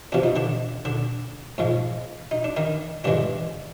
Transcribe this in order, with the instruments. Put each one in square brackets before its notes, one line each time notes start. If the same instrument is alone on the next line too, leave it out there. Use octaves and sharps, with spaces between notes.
[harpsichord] E2 C3 F3 D4
D#4
D3 D4
D3 D4
G#2 F3 G#3
D#4
D4
D#3 D#4
G2 D3 E3 G#3 D4